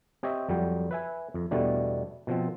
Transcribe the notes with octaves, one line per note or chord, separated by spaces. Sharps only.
C4 G4 C#5 D#5 E5
F2 F#3 G3 G5
B4 E5 G#5
F2
E2 B2 G3 A3 D4
B2 F3 C4